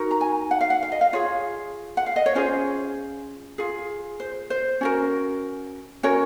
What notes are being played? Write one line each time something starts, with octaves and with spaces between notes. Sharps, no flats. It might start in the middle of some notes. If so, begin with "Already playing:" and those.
Already playing: D#4 F#4 A#4
A#5
G#5
F#5
F5
F#5
F5
D#5
F5
F4 G#4 C#5
F#5
F5
D#5
C#5
C#4 F4 G#4 C5
F4 G#4
C5
C5
C#4 F#4 A#4
C#4 F#4 A#4 C#5